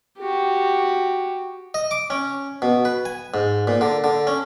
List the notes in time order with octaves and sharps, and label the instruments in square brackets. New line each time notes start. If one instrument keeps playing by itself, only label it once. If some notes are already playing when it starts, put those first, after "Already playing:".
[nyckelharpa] F#4 G4
[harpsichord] D#5
D6
C#4
B2
B4
G#5
G#2
A#2
D3
D3
C#4